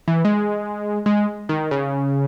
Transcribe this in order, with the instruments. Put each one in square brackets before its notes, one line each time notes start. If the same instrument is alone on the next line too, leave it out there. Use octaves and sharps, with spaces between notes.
[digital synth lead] E3
G#3
G#3
D#3
C#3